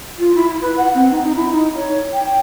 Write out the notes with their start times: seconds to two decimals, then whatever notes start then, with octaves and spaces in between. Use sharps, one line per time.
0.19 F4
0.35 E4
0.62 B4
0.77 F#5
0.95 C4
1.11 D#4
1.24 D#4
1.36 E4
1.50 D#4
1.76 C#5
2.13 G5